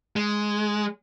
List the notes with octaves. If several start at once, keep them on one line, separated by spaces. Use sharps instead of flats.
G#3